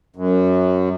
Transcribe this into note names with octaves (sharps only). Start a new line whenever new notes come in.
F#2